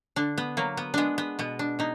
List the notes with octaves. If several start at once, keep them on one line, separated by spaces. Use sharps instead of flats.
D3 D4
B3
F#3 A#3
B3
G#3 B3 D4
B3
B2 B3
D4
B2 D#4